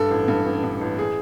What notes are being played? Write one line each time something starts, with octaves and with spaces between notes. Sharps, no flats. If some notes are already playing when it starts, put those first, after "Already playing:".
Already playing: G2 A4
A1
G2
A1
G2
A1
G#4